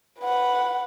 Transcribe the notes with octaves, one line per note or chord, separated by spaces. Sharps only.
B4 F#5